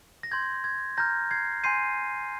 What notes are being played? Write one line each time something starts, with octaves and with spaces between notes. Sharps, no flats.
A#6
C6 G6 G#6
G#6
A#5 F6 G6 A#6
G#6 C7
G#5 C6 G6 C7 D#7